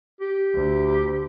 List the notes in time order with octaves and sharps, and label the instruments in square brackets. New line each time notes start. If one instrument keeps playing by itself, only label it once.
[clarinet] G4
[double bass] D2